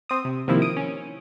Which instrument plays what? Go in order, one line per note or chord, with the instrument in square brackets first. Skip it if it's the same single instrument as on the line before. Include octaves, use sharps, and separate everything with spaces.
[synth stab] C4 D#6
C3
C3 D#3 F3 A#3 E4
D#6 D7
C#4